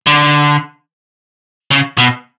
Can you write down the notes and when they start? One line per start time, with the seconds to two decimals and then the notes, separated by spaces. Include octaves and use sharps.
0.07 D3
1.71 C#3
1.98 B2